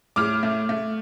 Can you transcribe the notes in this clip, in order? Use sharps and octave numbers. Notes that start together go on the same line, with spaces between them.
A2 D6 F6
A3
A3